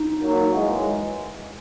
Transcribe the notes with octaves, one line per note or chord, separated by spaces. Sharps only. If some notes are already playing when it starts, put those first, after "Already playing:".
Already playing: D#4
F#3 A#3
E3 G#3